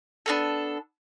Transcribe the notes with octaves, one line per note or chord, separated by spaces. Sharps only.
B3 D4 F4 A4